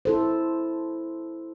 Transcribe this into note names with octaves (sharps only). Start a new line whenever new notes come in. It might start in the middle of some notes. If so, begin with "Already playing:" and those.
E4 A4 C5